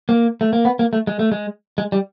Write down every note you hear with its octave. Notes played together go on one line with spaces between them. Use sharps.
A#3
A3
A#3
B3
A#3
A3
G#3
A3
G#3
G#3
G3